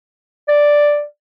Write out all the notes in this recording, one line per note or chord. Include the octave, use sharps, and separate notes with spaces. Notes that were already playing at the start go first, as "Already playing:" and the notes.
D5